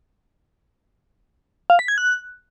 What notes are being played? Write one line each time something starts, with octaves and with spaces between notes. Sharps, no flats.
F5
B6
G#6
F#6